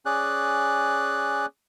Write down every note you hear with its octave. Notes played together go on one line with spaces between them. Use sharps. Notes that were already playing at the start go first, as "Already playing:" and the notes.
C#4 G#4 D5 F#6